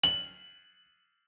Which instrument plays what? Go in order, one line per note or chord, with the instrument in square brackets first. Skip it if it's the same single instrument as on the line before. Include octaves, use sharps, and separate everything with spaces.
[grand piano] F#7